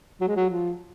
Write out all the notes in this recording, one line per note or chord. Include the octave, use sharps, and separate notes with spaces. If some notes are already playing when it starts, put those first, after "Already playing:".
F#3
G#3
F#3
F3